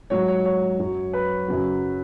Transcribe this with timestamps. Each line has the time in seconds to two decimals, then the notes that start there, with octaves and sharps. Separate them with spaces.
0.10 G#2 F#3 C#5
0.28 C#5
0.45 C#5
0.79 F#2 F#3
1.13 B4
1.48 F#2 C#3 F#3